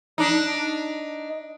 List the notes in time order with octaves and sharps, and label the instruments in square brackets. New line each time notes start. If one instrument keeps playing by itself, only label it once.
[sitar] D4 D#4